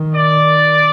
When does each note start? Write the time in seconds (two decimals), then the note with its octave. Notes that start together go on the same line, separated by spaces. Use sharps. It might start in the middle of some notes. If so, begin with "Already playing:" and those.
Already playing: D#3
0.14 D5